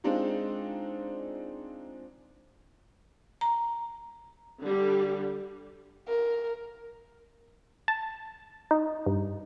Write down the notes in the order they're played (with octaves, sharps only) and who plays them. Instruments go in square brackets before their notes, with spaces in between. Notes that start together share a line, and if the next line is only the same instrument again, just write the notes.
[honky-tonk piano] G#3 C4 D4 D#4 F4
[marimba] A#5
[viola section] D3 G3
[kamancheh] A#4
[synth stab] A5
D#4
G2